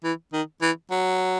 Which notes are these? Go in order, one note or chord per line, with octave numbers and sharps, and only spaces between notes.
E3
D#3
E3
F#3